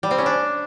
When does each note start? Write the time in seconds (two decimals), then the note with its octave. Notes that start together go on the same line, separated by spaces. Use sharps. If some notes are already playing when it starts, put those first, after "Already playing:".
0.03 G3
0.11 C4
0.18 C#4
0.26 D4